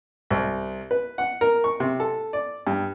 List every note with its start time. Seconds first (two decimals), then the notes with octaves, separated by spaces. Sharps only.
0.30 C2
0.91 B4
1.18 F#5
1.41 A#4
1.64 C#6
1.80 C3
2.00 A4
2.33 D5
2.67 G2